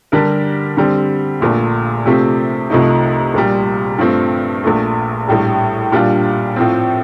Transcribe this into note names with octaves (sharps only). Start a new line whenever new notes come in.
D3 G3 D4 G4 A#4
D3 G3 C4
A#1 A#2 A3
C3 F3 A3 C4 G4
C2 C3 F3 A3 D#4
A#1 A#2 G3
G2 F3 A3 C4
A#1 A#2 A3
A#1 A2 G3
A#2 G3 D4 F4
A2 F3 C4